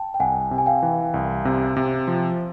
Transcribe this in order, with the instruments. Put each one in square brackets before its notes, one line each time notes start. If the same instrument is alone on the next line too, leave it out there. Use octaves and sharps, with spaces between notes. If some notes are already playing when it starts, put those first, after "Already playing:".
Already playing: [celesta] G5 A5
G5
[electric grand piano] C2 [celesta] F#5 G#5
[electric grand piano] C3
[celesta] G#5
F5 G5
[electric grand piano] E3
C2
C3
C3
F3